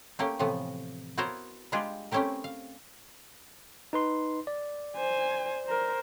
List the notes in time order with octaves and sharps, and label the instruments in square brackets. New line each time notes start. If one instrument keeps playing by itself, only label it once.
[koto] A3 A#3 C#4 G4
A2 C3 E3 F3 A3 B3
B3 E4 F#4 A#4 C5 C#5
G3 G#3 D4 F4 G4 G#4
A3 C4 C#4 E4 G4 A#4
F5
[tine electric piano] D#4 B4 C6
D5
[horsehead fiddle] C5 G#5
A#4 C5